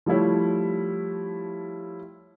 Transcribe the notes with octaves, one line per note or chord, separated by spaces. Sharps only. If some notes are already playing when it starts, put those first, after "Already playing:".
F3 G3 A3 E4 C#5